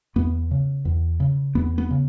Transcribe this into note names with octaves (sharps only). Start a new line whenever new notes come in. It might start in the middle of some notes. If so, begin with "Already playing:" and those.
E2 B3
C#3
E2
C#3
E2 B3
B3
C#3